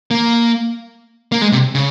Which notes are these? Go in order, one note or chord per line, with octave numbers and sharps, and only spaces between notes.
A#3
A#3
G#3
C3
C#3